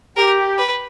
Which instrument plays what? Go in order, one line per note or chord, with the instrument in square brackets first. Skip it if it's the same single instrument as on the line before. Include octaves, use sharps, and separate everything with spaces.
[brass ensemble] G4 [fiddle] A#4
[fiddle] B4